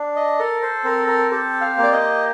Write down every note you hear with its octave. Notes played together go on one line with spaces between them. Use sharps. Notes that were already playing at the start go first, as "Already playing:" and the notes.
Already playing: D4
D#5
A4 A#4
C5
C4 A#4
A#4
G4 A4
F5
A#3
D5
D#5